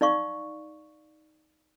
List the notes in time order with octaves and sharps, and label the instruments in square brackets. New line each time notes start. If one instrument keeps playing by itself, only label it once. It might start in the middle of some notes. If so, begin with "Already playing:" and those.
[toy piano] D#4 D5 F5 C#6 D6